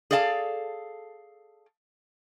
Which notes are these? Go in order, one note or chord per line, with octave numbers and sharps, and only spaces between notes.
G#4 A4 D5 F5 A5